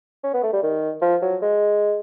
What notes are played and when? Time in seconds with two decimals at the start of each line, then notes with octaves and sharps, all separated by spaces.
0.23 C#4
0.33 B3
0.43 A3
0.53 G3
0.63 D#3
1.02 F3
1.22 F#3
1.42 G#3